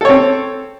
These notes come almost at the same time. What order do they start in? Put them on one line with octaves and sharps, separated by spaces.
A4 C#5 C4